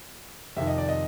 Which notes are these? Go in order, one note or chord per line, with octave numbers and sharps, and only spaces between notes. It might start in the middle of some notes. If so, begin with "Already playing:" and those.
F2 C3 D#3 E5
D#5
D5
D#5